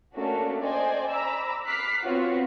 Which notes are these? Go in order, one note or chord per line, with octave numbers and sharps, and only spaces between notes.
A3 A#3 C#4 D4 F#4 A4
C5 D5 D#5 G5 G#5
A#5 B5 D6 E6
D6 F6 F#6 B6 C7
B3 C4 F4 F#4 C#5 F#5